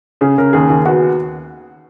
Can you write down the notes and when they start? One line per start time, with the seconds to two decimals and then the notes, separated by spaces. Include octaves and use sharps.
0.21 C#3 G#4
0.38 C#3 A#4
0.53 D#2 G#4
0.70 D#2
0.85 B3 F#4